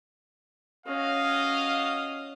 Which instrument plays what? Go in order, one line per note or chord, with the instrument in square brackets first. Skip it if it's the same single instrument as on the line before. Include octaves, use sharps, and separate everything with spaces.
[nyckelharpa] C#4 [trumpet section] F4 F#4 D#5 [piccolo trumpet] F5